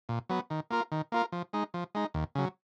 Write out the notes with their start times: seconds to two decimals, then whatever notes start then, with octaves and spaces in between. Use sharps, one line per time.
0.09 A#2
0.29 F#3 B3
0.50 D#3
0.70 A#3 F4 A#4
0.92 D#3
1.12 A#3 F4 A#4
1.32 F3
1.53 G#3 D#4
1.74 F3
1.95 G#3 D#4
2.14 D#2
2.35 C#3 F#3